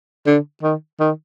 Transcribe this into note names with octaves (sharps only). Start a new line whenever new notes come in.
D3
D#3
D#3